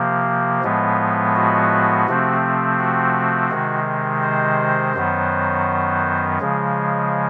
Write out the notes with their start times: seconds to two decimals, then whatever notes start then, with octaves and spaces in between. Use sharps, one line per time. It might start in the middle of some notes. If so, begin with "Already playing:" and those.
Already playing: C3 F3 A#3
0.63 A2 F3 G#3 B3
1.35 F#4
2.08 C3 F3 A3 C4
2.79 F#4
3.51 C3 D#3 G#3
4.23 C5
4.95 F#2 D#3 F#3 B3
6.40 C#3 F3 G#3